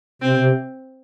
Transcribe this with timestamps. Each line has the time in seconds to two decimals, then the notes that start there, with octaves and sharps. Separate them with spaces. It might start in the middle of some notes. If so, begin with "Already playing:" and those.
0.22 C3 C4
0.36 C3